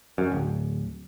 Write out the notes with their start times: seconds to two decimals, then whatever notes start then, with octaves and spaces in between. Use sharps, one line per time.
0.18 F#2
0.32 D1